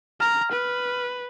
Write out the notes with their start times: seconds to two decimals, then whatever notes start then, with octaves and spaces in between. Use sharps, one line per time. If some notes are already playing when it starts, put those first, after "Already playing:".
0.20 A#5 F6
0.52 B4